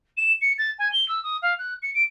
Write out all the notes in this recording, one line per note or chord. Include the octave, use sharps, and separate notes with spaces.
E7
C#7
A6
G#5
G7
E6
D#6
F5
F#6
C#7
D7